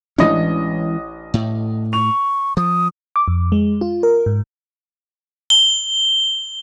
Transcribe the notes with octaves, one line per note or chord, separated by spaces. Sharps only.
A1 E3 G#3 C#4 D4 D#5
A2
C#6 F7
F3 D#6
D6
F2
G#3
F4
A#4
G#2
G7